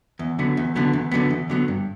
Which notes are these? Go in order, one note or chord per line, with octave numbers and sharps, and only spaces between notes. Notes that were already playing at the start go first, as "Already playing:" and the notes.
E2
D3 F#3 B3
E2
D3 F#3 B3
E2
D3 F#3 B3
E2
D3 F#3 B3
G2